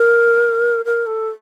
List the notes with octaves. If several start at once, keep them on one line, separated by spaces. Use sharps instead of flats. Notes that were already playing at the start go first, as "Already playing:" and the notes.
Already playing: A#4
A#4
A4